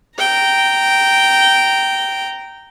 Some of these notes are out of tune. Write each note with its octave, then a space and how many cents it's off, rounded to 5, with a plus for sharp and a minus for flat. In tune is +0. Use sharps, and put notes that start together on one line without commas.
G5 -10 A#5 -10